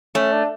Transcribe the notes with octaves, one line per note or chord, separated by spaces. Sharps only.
A3 C#4
D4